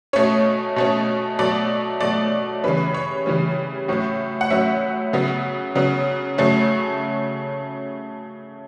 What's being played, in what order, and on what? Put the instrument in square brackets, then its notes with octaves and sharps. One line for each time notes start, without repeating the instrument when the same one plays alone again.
[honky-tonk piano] B2 A3 C#4 C#5
B2 A3 C#4
B2 F#3 A3 D5
B2 F#3 A3 D5
C#3 E3 G3 C#4 B4
C#5
C#3 E3 G3 C#4
A2 F#3 C#4
F#5
A2 F#3 C#4 E5
C#3 F#3 B3
C#3 F#3 B3
C#3 F#3 A3 C#4